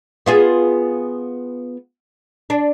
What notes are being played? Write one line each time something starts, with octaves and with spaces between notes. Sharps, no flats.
B3 F4 G#4
D4